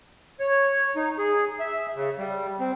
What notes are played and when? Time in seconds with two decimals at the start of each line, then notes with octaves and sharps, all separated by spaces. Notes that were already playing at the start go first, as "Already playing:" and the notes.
0.40 C#5
0.96 D#4
1.18 G#4
1.60 E5
1.95 C#3
2.19 G3
2.60 C4